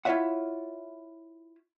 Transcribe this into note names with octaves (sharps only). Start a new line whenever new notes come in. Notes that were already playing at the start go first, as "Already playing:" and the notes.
E4 F4 G4 C#5 E5 F#5